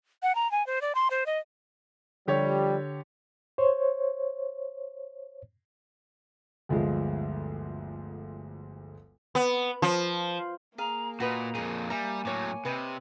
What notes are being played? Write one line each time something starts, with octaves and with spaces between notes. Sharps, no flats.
F#5
A#5
G#5
C5
D5
C6
C5
D#5
D3 F3 G3 G4 C#5
C5 C#5
G1 D2 F3 G#3
B3
F3
A#3 G#4 F5 A#5
A#2 F#4 B4 D#5 A#5
F2 A#2 G#4 D#5
G3 E5 G#5 A#5
A2 F#3 C#5 D6
C3 B4 C#5 D#5